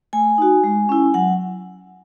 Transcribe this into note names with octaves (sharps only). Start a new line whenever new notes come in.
A3 G#5
D#4 F#4
G#3
C#4 E4
F#3 F#5